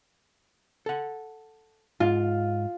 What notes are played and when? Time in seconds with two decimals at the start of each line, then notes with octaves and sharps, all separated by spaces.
0.86 A4 F#5
2.00 G#2 F4